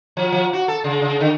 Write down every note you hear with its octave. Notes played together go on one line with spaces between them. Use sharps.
F3
F3
F#4
A4
C#3
C#3
D3